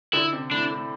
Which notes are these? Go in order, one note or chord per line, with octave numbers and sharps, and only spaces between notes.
D3 E4
C3
A2 D4
A2